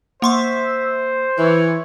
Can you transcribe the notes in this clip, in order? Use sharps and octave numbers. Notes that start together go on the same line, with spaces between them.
A#3 C5 E5 C6 C#6
E3 C#5